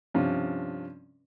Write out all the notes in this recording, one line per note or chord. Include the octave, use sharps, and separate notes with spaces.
G2 C3 F3 C#4